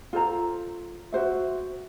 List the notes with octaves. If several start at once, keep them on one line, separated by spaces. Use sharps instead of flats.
F4 A4 C5 A#5
F#4 C5 E5